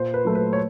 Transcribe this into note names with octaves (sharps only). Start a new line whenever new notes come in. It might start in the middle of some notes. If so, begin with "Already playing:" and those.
Already playing: A#2 C5
B4
F#3 A3
B4
C#5